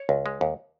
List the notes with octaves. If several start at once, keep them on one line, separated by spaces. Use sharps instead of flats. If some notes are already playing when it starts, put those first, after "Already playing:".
Already playing: C#5
C#2
G#3
D#2